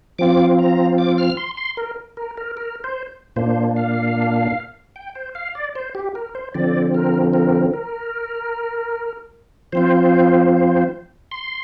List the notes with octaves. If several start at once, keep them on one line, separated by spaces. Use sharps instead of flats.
F3 C4 F4 D6
A#5
D6
F6
C6
C6
A#4
A#4
A#4
A#4
C5
A#2 A#3 D4 C5
F5
G5
C5
F5
D5
C5
G4
A#4
C5
D3 F3 C4 D5
A#4
A#4
A#4
F3 C4 F4 C5
C6